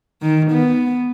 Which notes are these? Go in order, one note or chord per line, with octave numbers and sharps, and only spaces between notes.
D#3
B3